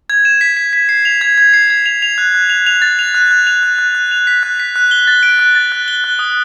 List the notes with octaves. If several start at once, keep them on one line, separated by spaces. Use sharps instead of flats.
G#6
E7
B6
B6
B6
C7
F7
G#6
G#6
C7
G#6
F7
F7
F#6
F#6
F7
F7
A6
F7
F#6
F#6
F7
F#6
F#6
F#6
F7
B6
F#6
B6
F#6
G7
A6
D7
F#6
A6
F#6
G7
F#6
D#6